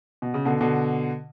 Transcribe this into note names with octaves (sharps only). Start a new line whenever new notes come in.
B2
C#3
B2 D3
B2 D3